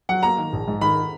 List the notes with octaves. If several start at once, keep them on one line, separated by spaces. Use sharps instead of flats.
F#3 F#5
A#3 A#5
D#3
A#1
G#2
D#3 B5